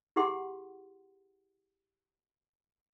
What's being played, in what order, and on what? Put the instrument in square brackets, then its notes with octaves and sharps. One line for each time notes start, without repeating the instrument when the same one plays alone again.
[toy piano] E4 G4 G#4 F#5 C6